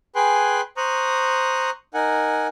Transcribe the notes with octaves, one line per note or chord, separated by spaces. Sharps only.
G#4 B4 G5 G#5 C6 F#6
C5 A#5 C#6 D#6 F#6
D#4 A#4 F#5 G#5